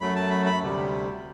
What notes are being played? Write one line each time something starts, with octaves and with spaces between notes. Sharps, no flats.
F#2 F#3 A3 B5
A5
B5
B5
D2 C3 G3